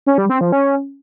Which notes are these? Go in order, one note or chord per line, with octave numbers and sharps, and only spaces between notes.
C#4
G3
C4
F3
C#4